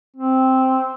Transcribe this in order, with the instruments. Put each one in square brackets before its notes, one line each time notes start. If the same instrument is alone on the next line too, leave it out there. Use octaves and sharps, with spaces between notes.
[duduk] C4